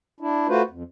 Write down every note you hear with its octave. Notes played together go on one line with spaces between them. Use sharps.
D4 E4
A3 F4 F#4 B4 C5
F2